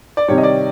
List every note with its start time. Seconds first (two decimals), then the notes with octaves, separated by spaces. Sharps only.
0.17 D5
0.28 C3 D#3 G3 C#5
0.38 D#5
0.43 D5